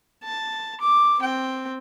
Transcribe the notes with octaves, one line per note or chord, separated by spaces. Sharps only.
A5
D6
C4 G5